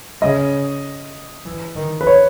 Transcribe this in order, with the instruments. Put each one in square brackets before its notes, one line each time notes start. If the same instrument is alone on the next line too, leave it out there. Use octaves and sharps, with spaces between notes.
[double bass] C#3 [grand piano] D#5
[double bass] E3
D#3
[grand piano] B4
C#5